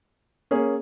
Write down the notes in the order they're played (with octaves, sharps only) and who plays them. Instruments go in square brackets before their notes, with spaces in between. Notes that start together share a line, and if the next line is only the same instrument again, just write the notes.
[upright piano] A#3 C#4 G#4